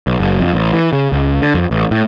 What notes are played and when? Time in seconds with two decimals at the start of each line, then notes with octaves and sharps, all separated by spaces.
0.07 B1
0.20 F#1
0.40 F2
0.53 A1
0.73 E3
0.93 C#3
1.12 C#2
1.42 D3
1.54 F2
1.71 A1
1.91 A2